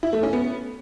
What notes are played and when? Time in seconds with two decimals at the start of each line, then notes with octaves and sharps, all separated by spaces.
0.03 E4
0.13 A3
0.23 C#4
0.33 B3